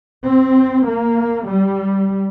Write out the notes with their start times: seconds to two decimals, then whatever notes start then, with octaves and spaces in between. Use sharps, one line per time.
0.24 C4
0.85 A#3
1.47 G3